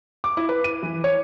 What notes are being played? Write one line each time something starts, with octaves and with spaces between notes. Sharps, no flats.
D6
E4
B4
D#7
E3
C#5